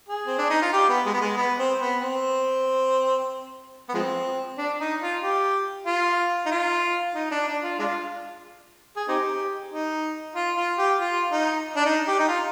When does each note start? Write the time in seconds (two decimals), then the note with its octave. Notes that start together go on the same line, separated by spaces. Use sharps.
0.08 G#4
0.27 C4
0.38 D4
0.51 D#4
0.62 F4
0.73 G4
0.89 B3
1.06 G#3
1.14 B3
1.21 G#3
1.37 B3
1.59 C4
1.80 B3
2.02 C4
3.89 B3
3.94 F3 G#3 C4
4.58 D4
4.80 D#4
5.02 F4
5.22 G4
5.86 F4
6.46 D#4
6.51 F4
7.15 D#4
7.31 D4
7.47 D4
7.63 F4
7.79 G#3 D4 F4
8.96 G#4
9.08 C4 D#4 G4
9.72 D#4
10.36 F4
10.57 F4
10.78 G4
11.00 F4
11.32 D#4
11.76 D4
11.86 D#4
12.08 G4
12.20 D#4
12.28 F4